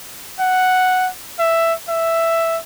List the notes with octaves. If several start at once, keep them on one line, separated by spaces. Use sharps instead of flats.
F#5
E5
E5